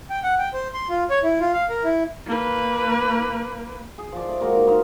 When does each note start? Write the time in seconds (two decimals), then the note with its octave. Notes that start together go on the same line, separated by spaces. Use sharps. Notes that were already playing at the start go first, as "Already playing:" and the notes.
0.10 G5
0.23 F#5
0.39 G5
0.53 C5
0.74 C6
0.90 F4
1.10 C#5
1.23 E4
1.40 F4
1.54 F5
1.70 A#4
1.84 E4
2.26 A#3 B4
3.98 G#4
4.12 F3 D5
4.28 A3
4.41 G#3 A#3 F#4 A#4
4.55 D#4
4.67 D#4 C5 F5